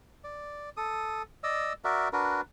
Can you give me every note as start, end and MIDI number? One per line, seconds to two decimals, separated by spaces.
0.24 0.70 74
0.77 1.22 69
0.77 1.22 87
1.44 1.73 74
1.44 1.73 75
1.44 1.73 88
1.84 2.09 66
1.84 2.09 70
1.84 2.09 74
1.84 2.09 76
2.13 2.41 62
2.13 2.41 66
2.13 2.41 70
2.13 2.41 71